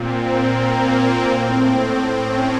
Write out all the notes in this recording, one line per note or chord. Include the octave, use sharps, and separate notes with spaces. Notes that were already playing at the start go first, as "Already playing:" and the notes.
Already playing: A#2 C4
A#3
A2 C4
C#4